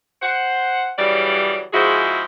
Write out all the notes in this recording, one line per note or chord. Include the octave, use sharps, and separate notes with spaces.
C5 F#5
C#3 E3 F#3 G3 D5
F3 G#3 E4 F#4 G#4 C5